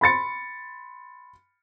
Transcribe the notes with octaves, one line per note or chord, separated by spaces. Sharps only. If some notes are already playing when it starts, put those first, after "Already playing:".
B5 C6 A6 C#7